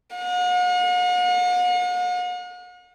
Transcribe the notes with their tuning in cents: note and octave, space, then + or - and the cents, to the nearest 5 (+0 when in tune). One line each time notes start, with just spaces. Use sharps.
F#5 -45